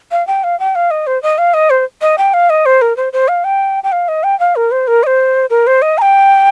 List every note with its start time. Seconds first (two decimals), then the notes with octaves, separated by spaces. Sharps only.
0.11 F5
0.27 G5
0.44 F5
0.60 G5
0.75 F5
0.91 D#5
1.07 C5
1.23 D#5
1.38 F5
1.54 D#5
1.70 C5
2.01 D#5
2.18 G5
2.34 F5
2.50 D#5
2.66 C5
2.81 A#4
2.97 C5
3.13 C5
3.28 F5
3.44 G5
3.84 G5
3.92 F5
4.08 D#5
4.23 G5
4.39 F5
4.56 A#4
4.71 C5
4.87 A#4
5.03 D#5
5.07 C5
5.50 A#4
5.67 C5
5.82 D#5
5.98 A#5
6.02 G5